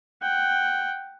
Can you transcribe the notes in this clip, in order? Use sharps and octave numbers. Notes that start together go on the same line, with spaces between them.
F#5 G5